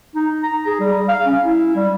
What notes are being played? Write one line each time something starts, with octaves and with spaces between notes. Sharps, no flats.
D#4
A#5
G#4
G3
F5
C#4
E4
G3